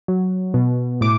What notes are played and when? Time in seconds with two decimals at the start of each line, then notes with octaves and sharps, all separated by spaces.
0.08 F#3
0.54 B2
1.01 A2 D6